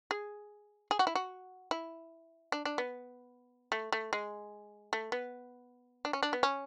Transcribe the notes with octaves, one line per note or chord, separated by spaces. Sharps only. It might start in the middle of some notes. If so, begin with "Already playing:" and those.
G#4
G#4
F#4
E4
F#4
E4
D4
D4
B3
A3
A3
G#3
A3
B3
D4
C#4
D4
B3
C#4